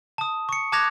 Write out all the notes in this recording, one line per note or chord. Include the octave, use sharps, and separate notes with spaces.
A5 D#6
C#6 C#7
A5 D6 F#6 G#6 A#6 F7